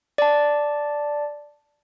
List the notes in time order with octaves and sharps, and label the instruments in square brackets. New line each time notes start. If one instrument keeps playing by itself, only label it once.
[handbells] D5 A5